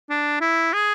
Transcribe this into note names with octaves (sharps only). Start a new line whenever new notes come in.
D4
E4
G#4